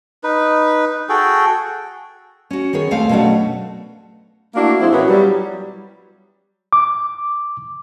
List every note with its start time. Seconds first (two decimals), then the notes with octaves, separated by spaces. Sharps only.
0.24 D#4 B4
1.09 F#4 G#4 A4 G5
2.51 C#4 F#4
2.73 D#3 B3 G#4 C#5
2.91 D#2 G#3 A3 C4 F5
3.09 B2 F#3 A3 C#4 D4 F#4
4.55 A3 A#3 D4 E4 F#4
4.80 F3 G#3 C4 E4
4.92 A#2 E3 B3 C#4 F#4
5.08 F#3 G3
6.73 D6